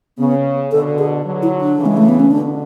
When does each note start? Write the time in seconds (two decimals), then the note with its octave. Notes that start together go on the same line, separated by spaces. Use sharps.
0.18 C#3 B3
0.72 B2 D3 A4
0.99 G#4
1.25 D3 F#3
1.43 E4
1.61 D4
1.78 C#3 E3
1.86 G#3
1.97 A3
2.09 B3
2.20 C#4
2.31 B2 D3 D4